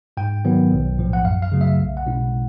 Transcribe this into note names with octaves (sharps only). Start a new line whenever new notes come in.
G#2 G5
D#3 F#3 B3
B1
A2 F3
F#5
F#2 F5
F5
C#3 F#3 A3
E5
B1
F#5
B2 G#3 C#4 E4